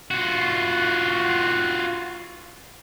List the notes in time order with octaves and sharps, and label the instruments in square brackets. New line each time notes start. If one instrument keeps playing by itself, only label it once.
[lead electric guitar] F4 F#4